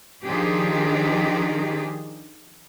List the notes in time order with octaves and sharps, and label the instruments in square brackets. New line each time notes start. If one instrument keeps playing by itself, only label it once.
[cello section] D#3 F3 D4 G4 G#4